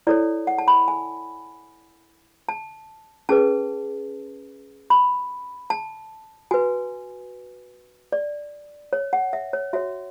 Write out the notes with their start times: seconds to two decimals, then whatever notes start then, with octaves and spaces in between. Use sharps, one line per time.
0.07 E4 A4 C#5 D5
0.47 F#5
0.58 A5
0.68 B5
0.88 G#5
2.49 A5
3.29 C#4 G#4 B4 A5
4.90 B5
5.70 A5
6.51 F#4 B4 G#5
8.12 D5
8.93 C#5
9.13 F#5
9.33 E5
9.53 C#5
9.73 F#4 C#5 E5